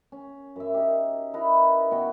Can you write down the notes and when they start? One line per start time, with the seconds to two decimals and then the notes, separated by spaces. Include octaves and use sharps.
0.12 C#4
0.56 F#2 E5
0.74 D#4 G4
1.34 D#4 E4 A#4 B4
1.91 B2 F#4 G5